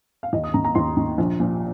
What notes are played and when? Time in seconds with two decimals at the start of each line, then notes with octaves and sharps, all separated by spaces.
0.23 F5
0.33 D#2 D#5
0.44 D#6
0.54 D#3 A#5
0.65 A#5
0.75 D#2 C6
0.97 D#3
1.18 A#1
1.39 A#2 F3